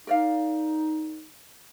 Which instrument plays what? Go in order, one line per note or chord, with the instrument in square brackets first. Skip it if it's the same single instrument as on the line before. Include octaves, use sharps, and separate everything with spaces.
[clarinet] D#4 [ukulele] A#4 D5 F5